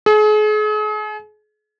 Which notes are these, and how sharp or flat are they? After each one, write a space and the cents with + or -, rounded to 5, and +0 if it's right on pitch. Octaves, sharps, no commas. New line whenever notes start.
G#4 +40